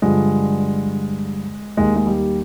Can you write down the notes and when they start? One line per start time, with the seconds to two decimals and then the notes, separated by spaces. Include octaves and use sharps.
0.02 G2 D3 F3 G#3
1.77 D#2 D#3 G#3
1.96 G#3
2.07 G3